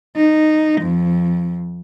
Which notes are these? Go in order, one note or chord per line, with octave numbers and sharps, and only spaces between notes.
D#4
F2